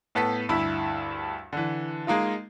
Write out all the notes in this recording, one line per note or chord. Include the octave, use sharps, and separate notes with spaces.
A2 B3 A4 B6
D2 G2 E4 B5
D3 E3
G#3 A#3 D#4 F4